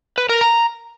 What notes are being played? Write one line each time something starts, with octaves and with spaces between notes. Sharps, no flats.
B4
A#4
A#5